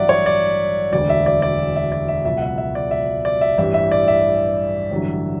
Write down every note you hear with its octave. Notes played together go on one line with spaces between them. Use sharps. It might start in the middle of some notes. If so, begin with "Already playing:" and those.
Already playing: A1 G2 F#3 D5 E5 F#5
C#5
D5
E1 D2 D3 D5
E5
D5
D5
E5
D5
E5
C#2 B2 F#3 E5
F#5
E5
E5
D5
E5
D5
E5
A1 G2 E3 G3 E5
E5
D5
E5
A1 G2 D3 F#3